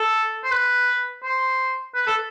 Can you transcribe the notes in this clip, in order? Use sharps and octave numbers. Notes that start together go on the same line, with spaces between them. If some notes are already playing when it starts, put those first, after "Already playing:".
Already playing: A4
C5
B4
C5
B4
A4